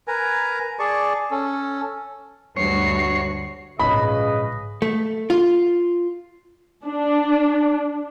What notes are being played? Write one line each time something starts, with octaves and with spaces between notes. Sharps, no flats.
A#4 B4 G#5 A#5
G#4 D5 A5 C#6
C#4 A4
D2 G2 F#4 C#5 C7
A#1 G#2 C#3 B4 D#5 B5
A3
F4
D4